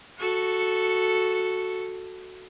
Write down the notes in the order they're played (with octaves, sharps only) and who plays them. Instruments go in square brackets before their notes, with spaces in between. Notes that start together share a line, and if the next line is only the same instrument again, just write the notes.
[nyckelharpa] F#4 A4